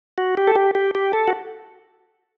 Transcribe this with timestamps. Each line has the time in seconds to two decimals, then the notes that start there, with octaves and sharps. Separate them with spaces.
0.18 F#4
0.37 G4
0.47 A4
0.55 G4
0.75 G4
0.95 G4
1.13 A4
1.28 F#4